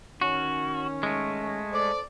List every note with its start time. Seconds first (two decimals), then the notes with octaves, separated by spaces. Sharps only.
0.21 D#3 C#4 F#4
1.03 G#3 A3
1.72 A4 C5 D5